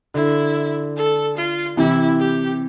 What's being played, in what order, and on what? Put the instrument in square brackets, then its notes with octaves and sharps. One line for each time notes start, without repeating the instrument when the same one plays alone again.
[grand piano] D3 [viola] E4
[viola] A4
F4
[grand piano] C3 E3 [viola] E4
[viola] G4